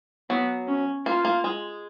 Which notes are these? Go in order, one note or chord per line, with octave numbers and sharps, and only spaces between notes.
F#3 B3
C#4
A#3 F4
A#3
G#3